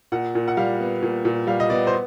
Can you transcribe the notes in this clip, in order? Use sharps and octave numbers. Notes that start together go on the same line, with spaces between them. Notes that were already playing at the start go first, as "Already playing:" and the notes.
A#2 F#5
A#2
F#5
G3 F5
B3
A#2
A#2
G3 F5
D#5
B3 D5
C5